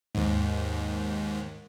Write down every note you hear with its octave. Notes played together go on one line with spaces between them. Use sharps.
D#2 G#2